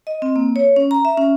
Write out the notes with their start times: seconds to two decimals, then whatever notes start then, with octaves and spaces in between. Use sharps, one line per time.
0.07 D#5
0.22 C4
0.36 A#3
0.56 C#5
0.76 C#4
0.91 A#5
1.05 E5
1.18 C#4